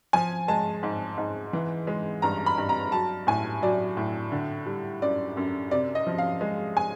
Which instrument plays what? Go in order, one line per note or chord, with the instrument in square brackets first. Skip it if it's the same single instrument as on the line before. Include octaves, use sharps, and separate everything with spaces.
[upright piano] F3 G#5
G#3 A5
G#2
G#2
E3
G#3
G2 A#5
B5
G2
A#5
F#3 A5
A2 G#5
F#3 D5
A2
D3
G3
F#2 D5
F#2
C3 D5
D#5
F3
F5
G#3
G#5